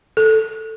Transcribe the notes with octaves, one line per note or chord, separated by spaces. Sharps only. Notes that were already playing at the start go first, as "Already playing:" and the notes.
A4